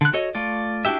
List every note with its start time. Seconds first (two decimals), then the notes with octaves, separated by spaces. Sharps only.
0.01 D3 F#6
0.13 F#4 A4 C#5 D#5
0.35 A3 F4 D5
0.85 D4 E4 F#4 G4 E5